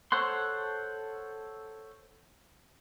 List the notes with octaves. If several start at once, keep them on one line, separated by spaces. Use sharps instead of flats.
A4 C5 C#5 F#5 C6